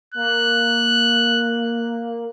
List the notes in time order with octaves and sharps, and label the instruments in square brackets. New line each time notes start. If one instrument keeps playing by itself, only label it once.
[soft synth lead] A#3 [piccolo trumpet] F#6